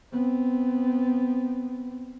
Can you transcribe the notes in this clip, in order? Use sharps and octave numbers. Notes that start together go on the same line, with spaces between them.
B3 C4